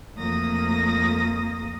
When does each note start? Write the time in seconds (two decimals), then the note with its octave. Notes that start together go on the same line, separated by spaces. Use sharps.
0.16 F2 A3 A#3 D#6 A#6